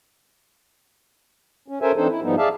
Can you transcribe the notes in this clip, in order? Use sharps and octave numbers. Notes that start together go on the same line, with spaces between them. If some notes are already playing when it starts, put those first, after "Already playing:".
C#4
C#4 A4 A#4 C5 E5 G#5
E3 C4 D4 D#4 A4 C5
E4
G#2 F3 G3 B3 D#4
G#4 D5 E5 F5 A5